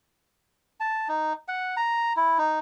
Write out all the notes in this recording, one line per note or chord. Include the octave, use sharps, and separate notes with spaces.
A5
D#4
F#5
A#5
E4
D#4